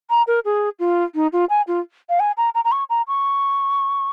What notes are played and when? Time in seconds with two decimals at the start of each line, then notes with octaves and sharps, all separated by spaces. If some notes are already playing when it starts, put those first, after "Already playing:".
0.10 A#5
0.27 A#4
0.45 G#4
0.79 F4
1.15 D#4
1.33 F4
1.50 G#5
1.68 F4
2.09 F5
2.20 G#5
2.37 A#5
2.55 A#5
2.65 A#5
2.72 C#6
2.90 A#5
3.08 C#6